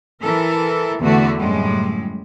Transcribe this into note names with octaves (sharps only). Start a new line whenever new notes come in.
E3 A4 A#4
E2 D3 A3 F#4
F#2 A2 G3 G#3